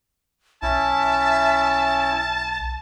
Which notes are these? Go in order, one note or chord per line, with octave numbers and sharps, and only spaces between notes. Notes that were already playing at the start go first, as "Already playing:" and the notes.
B1 C#4 E4 E5 A5